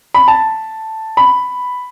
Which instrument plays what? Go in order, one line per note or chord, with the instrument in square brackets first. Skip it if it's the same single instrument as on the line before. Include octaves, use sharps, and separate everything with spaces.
[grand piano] B5
A5
B5